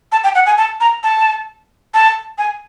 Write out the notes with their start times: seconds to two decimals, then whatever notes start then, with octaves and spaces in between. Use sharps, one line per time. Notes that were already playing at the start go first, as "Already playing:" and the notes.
0.12 A5
0.24 G5
0.35 F#5
0.46 G#5
0.58 A5
0.80 A#5
1.03 A5
1.94 A5
2.38 G#5